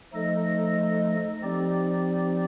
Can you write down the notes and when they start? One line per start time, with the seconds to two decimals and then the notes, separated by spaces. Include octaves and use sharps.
0.13 F3 A3 D#4 A4 D#5
1.42 F3 C4 D#4 G4 D5